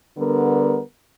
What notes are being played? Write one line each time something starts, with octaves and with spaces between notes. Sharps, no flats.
D3 G3 B3 A#4